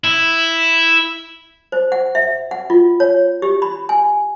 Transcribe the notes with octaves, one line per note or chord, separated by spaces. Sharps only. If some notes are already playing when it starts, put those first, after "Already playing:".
E4
C5
F#5
E5
F#5
F4
C#5
G4
B5
G#5